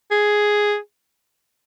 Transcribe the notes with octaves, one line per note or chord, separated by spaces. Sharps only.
G#4